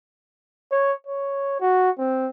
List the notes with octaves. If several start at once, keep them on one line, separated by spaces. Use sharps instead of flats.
C#5
C#5
F#4
C4